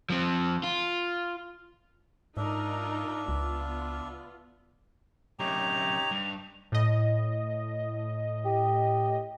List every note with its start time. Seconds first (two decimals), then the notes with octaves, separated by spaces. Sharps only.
0.10 F3 C4
0.64 F4
2.37 G#2 D4 D#4 F4 A#4 E5
3.28 C#2 B3 F4
5.40 F#2 C3 D#4 G4 C#5 A#5 F7
6.11 G2
6.72 A2 D#5
8.46 G4